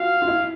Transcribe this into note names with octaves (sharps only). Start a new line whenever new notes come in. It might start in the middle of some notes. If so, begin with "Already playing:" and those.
Already playing: F4 F#4 F5
F4
E4